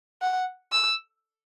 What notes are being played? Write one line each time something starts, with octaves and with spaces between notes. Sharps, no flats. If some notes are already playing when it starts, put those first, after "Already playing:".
F#5
E6